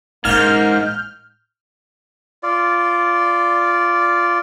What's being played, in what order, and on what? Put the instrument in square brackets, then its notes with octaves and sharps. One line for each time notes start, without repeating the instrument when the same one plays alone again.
[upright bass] A1 C#4 [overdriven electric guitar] G#2 [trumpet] A#3 [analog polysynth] F6 G6
[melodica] F4 D5